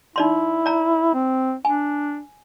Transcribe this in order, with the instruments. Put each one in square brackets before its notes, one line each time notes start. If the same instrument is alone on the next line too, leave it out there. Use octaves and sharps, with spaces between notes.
[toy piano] D#4 D5 C6 [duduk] E4
[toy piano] D5 A#5
[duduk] C4
[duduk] D4 [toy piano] G#5